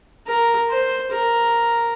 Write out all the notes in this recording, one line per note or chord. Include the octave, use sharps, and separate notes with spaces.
A#4
C5
A#4